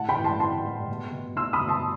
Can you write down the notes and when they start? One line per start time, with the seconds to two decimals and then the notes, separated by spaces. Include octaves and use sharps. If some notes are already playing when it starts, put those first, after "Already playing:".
Already playing: A2 F#5 A5
0.09 G5 B5
0.16 E3
0.24 A5 C6
0.40 E3 A5 C6
0.64 A2
0.88 B2
1.12 B2
1.36 B2 C6 E6
1.53 B5 D#6
1.60 B2
1.68 A5 C6